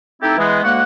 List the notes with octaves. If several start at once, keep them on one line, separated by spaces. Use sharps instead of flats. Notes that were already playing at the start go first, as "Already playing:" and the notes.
A3 C4 D#4 E4 G4 A4
E3 G#3 B3
D2 G#3 A#3 F#4 F#5